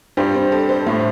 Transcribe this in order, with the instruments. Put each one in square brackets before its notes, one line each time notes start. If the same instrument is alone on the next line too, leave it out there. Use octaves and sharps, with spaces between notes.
[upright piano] G2 G3 [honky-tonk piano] C5
[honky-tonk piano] C4
A4
C5
[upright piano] A2 [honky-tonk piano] A3